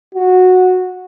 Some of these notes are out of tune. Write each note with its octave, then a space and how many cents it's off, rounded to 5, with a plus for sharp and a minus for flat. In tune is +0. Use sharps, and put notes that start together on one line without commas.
F#4 -10